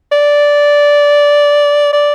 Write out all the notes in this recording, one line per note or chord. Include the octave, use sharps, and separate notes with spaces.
D5
D5